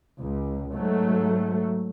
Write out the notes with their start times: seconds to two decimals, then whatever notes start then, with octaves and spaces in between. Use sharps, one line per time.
0.20 C#2
0.74 G#2 F#3 A3